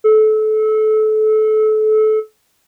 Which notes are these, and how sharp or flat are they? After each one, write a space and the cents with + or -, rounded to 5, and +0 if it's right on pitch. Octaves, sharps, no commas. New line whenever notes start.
A4 -25